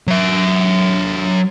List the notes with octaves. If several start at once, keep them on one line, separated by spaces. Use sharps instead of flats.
F#3 E5